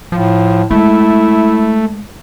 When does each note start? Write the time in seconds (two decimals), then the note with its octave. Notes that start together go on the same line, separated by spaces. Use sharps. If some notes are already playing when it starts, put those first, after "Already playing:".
0.12 A2 F3
0.71 G#3 A3 E4